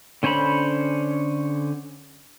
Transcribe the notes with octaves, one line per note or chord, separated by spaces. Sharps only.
D3 C#4 C5 C#5 B5